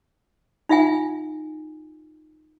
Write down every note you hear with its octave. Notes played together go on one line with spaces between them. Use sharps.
D#4 F4 E5 F#5 G#5